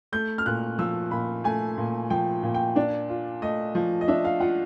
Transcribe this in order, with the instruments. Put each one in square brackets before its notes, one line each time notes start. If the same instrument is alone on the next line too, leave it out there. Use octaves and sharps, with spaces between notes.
[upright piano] A3 G6
F6
A#2 F#6
F3 E6
A#2 B5
A3 G#5
A#2
F3 G5
A#2
G5
D4 D5
F4
A3 D#5
F3
D#5
D4 E5
F5
F4 F#5